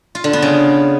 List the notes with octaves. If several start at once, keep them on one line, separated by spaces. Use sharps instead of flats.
F4
D3
B3
C#3